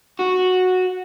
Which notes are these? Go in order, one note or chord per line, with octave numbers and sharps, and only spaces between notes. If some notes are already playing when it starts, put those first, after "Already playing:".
F#4